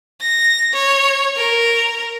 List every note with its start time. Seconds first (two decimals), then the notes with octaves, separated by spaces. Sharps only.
0.21 A#6
0.73 C#5
1.36 A#4